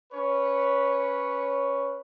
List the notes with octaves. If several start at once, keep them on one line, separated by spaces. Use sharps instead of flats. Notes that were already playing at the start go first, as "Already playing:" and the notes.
C#4 B4 C#5